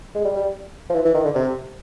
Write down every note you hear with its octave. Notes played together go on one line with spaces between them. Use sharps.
G#3
G3
G3
F3
E3
E3
D#3
D3
C3